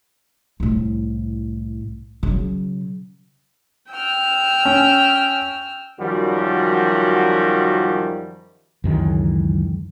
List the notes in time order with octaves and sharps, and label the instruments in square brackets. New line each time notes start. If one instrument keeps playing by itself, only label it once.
[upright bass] C2 A2
C#3 F#3
[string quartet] G5 E6 F6
[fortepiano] C#4
[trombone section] F#2 D#3 F3 G3 C#4 F#4
[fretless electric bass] C#2 F#2 D#3 E3